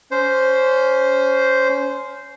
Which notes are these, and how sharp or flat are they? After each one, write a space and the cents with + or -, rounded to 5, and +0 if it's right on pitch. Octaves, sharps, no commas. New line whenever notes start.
C#4 +20 C5 -5